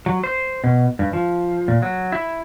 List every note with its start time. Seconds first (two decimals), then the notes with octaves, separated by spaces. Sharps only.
0.06 F#3
0.24 C5
0.64 B2
0.99 G2
1.13 F3
1.68 A#2
1.82 F#3
2.12 E4